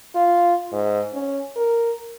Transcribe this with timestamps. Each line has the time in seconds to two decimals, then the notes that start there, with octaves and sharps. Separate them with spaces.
0.16 F4
0.73 G#2
1.14 C#4
1.56 A#4